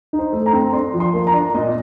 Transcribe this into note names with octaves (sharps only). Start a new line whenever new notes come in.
D#4
C5
A3
A#5
C4
D4 C6
F3
C6
A#3
A#5
D4
A#2 D#5